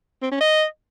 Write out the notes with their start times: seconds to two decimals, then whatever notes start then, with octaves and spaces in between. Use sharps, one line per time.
0.22 C4
0.31 C#4
0.41 D#5